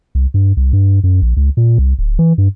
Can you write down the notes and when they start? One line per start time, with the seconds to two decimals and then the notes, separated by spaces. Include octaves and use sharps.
0.15 C2
0.34 G2
0.57 C2
0.73 G2
1.04 F#2
1.22 A#1
1.37 C#2
1.57 A#2
1.78 C2
1.99 D1
2.19 E3
2.38 G2